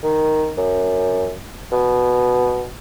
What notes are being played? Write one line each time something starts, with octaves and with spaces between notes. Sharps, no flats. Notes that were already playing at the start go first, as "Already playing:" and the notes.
D#3
F#2
B2